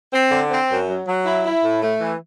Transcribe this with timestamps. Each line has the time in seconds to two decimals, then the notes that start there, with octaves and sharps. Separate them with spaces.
0.13 C4
0.31 D3
0.49 C4
0.69 F#2
0.88 F#3
1.07 F#3
1.25 E4
1.44 E4
1.63 A2
1.82 A3
2.01 E3